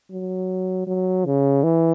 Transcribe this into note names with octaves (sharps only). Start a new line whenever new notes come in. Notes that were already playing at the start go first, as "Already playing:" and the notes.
F#3
F#3
C#3
E3